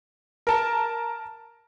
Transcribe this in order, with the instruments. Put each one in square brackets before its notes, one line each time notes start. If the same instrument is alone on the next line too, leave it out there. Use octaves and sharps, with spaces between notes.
[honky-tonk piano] A#4 A5